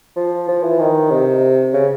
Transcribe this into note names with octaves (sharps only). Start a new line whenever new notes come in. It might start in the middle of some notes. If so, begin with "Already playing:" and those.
F3
F3
E3
D#3
C3
C#3